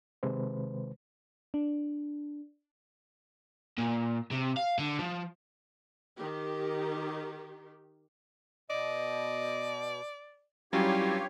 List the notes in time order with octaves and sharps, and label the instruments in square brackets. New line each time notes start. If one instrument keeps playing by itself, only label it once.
[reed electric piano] C3 D#3 G#3 B4 C5
[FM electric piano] D4
[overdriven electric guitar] A#2
C3
F5
D3
F3
[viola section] D#3 G4
[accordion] B2 [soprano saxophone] D5 [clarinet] D#5
[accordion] G2 G4 C#5 [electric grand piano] F#3 G3 C#4 [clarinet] E4 [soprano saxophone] F4